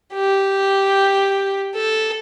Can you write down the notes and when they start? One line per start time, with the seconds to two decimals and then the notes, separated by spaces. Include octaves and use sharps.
0.14 G4
1.75 A4